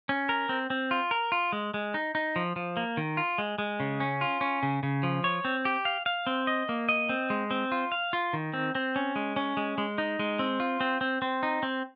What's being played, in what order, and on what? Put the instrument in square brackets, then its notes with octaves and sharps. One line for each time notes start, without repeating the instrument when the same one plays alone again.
[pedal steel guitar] C#4
A#4
C4
C4
F4
A#4
F4
G#3
G#3
D#4
D#4
F3
F3
A#3
D#3
F4
G#3
G#3
C#3
C#4
F4
C#4
C#3
C#3
F3
C#5
C4
G4
F5
F5
C4
D#5
A#3
D#5
C4
G#3
C4
F4
F5
F4
D#3
C4
C4
C#4
G#3
C#4
G#3
G#3
D#4
G#3
C4
F4
C4
C4
C4
D#4
C4